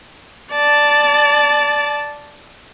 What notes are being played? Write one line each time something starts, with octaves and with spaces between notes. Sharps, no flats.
D5 A5